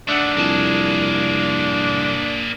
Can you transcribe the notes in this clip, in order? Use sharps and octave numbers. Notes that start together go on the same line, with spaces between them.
D#3 A3 D4 E5 F#5
C2 F2 A#3 G#4 A5